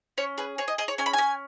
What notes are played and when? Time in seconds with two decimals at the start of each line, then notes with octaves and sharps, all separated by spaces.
0.18 C#4 C#5
0.38 G#4 B4
0.58 G#4 C#5
0.68 D#5
0.78 G#4 D#5
0.88 C#5
0.98 C#4 G#5
1.06 B5
1.13 C#4 G#5